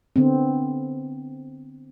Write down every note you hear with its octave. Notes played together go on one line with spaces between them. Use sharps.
D3 B3 C4